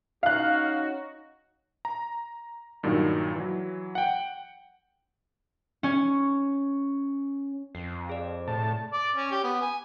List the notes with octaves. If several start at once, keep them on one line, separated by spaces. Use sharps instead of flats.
C#4 D#4 F#4 F5 F#6
A#5
G2 A#2 D#3 F#3 D#4
E3 F#3
F#5 G5
C#4 C#5
F2 C7
G#4 D5
A2 A5
D5
C#4
G4
B3
G#5